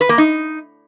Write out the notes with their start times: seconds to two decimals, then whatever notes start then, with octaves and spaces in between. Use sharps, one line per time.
0.01 B4
0.09 A#3
0.18 D#4